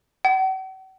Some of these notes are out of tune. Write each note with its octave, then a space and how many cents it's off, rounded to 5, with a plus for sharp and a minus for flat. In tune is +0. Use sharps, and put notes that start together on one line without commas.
F#5 +45